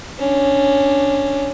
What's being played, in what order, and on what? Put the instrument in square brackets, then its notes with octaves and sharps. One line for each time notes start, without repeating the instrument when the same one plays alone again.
[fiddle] C#4 D4